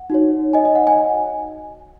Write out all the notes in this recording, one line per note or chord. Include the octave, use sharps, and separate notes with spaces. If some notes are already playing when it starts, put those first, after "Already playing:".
Already playing: F#5
D#4 F#4 C#5
D#5 G#5
D#5
F#5
G#5